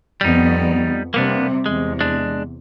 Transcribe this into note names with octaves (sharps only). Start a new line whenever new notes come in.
F2 G3 B3 D#4
C3 G3 A#3 B3 D4
E2 C3 G#3
G#3 D4